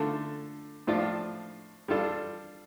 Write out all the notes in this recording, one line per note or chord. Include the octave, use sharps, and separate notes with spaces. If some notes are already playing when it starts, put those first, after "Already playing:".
Already playing: D3 A3 F4 A4
A2 F3 D4 F4
G3 D4 F4 A4